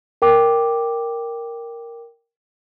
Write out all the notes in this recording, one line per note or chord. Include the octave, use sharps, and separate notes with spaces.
A#4 G5 D6